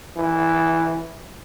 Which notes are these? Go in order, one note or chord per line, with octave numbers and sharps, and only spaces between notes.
E3